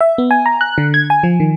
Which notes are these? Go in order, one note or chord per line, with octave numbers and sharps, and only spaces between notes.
E5
B3
G#5
A#5
F#6
D3
G#6
G#5
F3
D#3